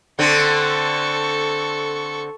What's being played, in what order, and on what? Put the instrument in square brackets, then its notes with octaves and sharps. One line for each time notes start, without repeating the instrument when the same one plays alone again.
[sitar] D3 C4 [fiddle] A4 C#6